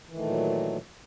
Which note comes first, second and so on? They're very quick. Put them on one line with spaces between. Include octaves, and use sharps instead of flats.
E3 D#3 A3 A#2 F#3